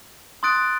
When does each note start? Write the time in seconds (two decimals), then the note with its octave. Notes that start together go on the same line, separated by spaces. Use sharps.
0.43 C6 D#6 F#6 A6 D7